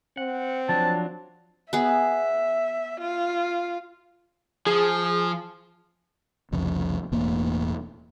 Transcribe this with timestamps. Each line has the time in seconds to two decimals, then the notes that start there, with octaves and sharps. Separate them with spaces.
0.17 C4 F#5
0.69 F3 F#3 D4 A5
1.73 B3 G#4 E5
3.01 F4
4.67 F3 G#4
6.52 F1 C2 F2 C#3
7.11 E1 E2 A2 A#3